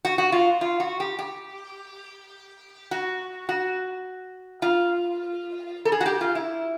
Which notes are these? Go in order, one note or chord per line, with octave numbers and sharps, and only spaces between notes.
F#4
F#4
F4
F4
F#4
G4
G4
F#4
F#4
F4
A4
G#4
F#4
G4
F4
E4